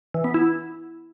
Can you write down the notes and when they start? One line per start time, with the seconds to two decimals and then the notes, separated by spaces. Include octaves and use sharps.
0.14 E3
0.24 B3
0.34 E4